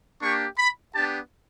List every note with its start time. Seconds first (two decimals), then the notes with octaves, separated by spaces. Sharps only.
0.21 A#3 D4 G4 C#6
0.57 B5
0.93 B3 D4 G4 A5